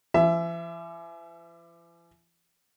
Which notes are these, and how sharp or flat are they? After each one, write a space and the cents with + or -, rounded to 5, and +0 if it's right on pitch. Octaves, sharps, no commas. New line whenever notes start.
E3 +45 E5 +20